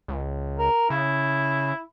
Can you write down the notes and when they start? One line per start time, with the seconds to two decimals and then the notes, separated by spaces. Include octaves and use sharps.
0.08 C#2
0.59 A#4
0.90 C#3 E4